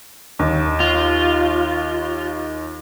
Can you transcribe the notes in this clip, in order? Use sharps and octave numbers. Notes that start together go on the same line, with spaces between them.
D#2
F4